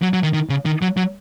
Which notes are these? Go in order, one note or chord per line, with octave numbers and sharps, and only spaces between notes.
F#3
F#3
D#3
D#3
C#3
D#3
F#3
F#3